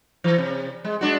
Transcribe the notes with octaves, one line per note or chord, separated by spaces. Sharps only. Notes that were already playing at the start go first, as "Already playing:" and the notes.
E3
C3
G#3
G#3 D4 F#4